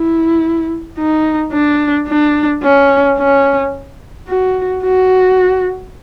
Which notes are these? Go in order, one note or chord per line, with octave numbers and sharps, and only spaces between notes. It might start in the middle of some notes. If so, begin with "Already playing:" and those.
Already playing: E4
D#4
D4
D4
C#4
C#4
F#4
F#4